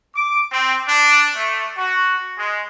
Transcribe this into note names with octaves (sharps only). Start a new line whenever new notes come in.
D6
C4
D4
A3
F#4
G#3